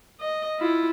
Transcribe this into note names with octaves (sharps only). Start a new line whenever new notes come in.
D#5
E4 F4